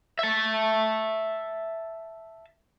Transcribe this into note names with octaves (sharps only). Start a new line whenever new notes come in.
E5 A5